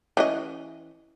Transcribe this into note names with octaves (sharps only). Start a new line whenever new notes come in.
E3 C#4 D#5